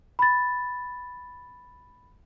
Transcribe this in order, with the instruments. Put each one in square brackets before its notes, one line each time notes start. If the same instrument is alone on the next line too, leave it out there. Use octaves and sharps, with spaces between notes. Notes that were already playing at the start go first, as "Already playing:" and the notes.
[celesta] B5 A6